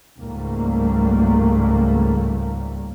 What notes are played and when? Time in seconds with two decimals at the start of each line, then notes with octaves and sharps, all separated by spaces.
0.19 C#2 G#2 G3 A3 A#3